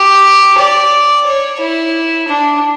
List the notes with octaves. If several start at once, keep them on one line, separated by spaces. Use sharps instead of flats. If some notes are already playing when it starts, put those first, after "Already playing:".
Already playing: G4
D5
C#5
E4
D4